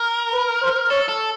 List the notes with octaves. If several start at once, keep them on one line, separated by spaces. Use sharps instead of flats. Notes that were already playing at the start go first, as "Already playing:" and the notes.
Already playing: A#4
B4
C5
A4 C#5
A4